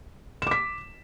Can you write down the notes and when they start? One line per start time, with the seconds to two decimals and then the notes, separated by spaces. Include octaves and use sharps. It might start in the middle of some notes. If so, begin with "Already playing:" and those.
0.42 E7
0.47 D6
0.51 B6